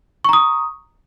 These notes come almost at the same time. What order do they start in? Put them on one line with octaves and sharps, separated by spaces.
C#6 A#5 D#6